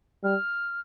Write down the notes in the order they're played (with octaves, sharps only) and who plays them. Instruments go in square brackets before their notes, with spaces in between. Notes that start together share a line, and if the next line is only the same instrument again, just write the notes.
[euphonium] G3 [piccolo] F6